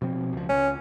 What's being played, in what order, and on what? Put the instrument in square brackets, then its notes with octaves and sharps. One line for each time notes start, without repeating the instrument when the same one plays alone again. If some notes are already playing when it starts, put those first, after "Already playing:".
[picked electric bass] B2 F3 C4
C#2 F3
[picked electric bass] C#2 [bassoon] C#4